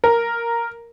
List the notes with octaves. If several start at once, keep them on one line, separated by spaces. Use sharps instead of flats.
A#4